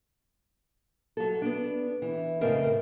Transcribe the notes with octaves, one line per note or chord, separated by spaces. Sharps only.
F#3 A4
B3 D4
E3
F2 A2 C#3 C4 A#4 D#5